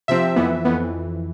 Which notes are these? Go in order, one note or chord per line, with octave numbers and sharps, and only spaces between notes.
C3 F3 C4 E5
F2 E3 B3
F2 E3 B3